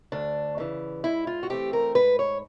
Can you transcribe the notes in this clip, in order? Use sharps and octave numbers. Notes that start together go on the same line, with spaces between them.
D2 D4
C#3 E3
G#2 E4
F4
F#4
E3 A3 C4 G4
A#4
G#2 B4
C#5